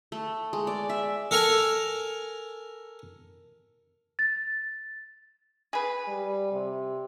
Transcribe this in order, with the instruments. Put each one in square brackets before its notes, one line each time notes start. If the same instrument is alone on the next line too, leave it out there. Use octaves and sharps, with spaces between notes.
[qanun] A3
G#3
D5
E5
[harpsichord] A4 A#4 G#5 A#5
[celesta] A6
[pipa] G#4 B4
[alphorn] G3
C3